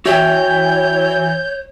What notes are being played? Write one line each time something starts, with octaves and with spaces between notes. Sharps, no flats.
E3 F#4 C#5 E5 G5 G6